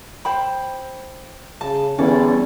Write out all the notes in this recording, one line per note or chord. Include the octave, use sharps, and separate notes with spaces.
C5 G5 B5
C#3 A5
E2 D3 G3 C#4 A4 D5